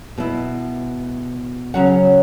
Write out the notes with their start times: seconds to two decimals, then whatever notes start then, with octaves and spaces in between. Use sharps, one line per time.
0.18 B2 B3 E4
1.74 C#3 F#3 C#4 F#5